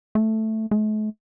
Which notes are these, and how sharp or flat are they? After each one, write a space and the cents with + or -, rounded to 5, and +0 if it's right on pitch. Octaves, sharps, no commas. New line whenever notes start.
A3 +0
A3 -45